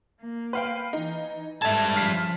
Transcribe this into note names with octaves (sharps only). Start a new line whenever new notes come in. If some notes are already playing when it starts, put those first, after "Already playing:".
A#3
B4 F5 G5
E3 D#4
G#2 G3 A4 E5 A5 G#6
C#3 F3 F6 B6 C7